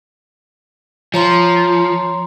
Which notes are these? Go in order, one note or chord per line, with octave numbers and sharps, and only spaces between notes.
F3 C#5 A#5 C6